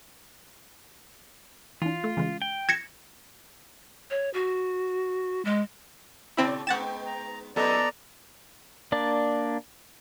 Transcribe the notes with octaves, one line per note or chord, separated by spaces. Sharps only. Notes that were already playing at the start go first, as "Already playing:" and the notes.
E3 D4 F4
A3
C#3 E3 G#3
G5
G#6 A#6 C#7 E7
C#5
F#4
G#3
A#2 C#3 C4 E4 D5
G#3 B3 D#4 F#5 G5 A6 E7
A#5
F3 A#3 B3 D#4 A4 D5 D#5 A#5
A#3 D4 D5